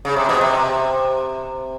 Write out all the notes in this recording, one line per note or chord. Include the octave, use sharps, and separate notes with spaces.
C#3
C3
B2
C3